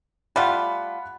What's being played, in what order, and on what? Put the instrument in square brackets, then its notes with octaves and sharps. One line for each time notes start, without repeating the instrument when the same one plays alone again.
[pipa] G3 A3 F4 [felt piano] F#5 B5